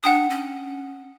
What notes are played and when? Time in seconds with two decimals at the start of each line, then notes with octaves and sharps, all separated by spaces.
0.04 D4 F#5 G5 D#6
0.30 C#4